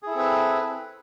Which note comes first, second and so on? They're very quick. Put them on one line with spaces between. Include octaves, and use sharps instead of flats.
G#4 E4 A4 C4 B4